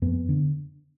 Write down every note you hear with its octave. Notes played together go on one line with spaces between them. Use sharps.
F2 B3
D3